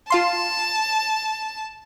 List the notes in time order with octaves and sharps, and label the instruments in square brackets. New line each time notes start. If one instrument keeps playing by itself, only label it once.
[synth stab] F4 F5 C6 [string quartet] A5